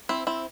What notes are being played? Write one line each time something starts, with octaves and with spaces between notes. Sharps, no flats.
C4 E4
C4 E4